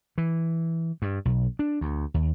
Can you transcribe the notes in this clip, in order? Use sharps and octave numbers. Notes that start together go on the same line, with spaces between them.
E3
G2
B1
D4
D2
D#2